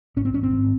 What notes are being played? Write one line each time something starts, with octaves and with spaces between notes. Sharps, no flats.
G#1 C#4
C4
G#1 C#4
C4
G#1